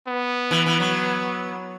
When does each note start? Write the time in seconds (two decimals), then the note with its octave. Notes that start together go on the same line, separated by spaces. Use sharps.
0.08 B3
0.51 E3
0.66 E3
0.80 F#3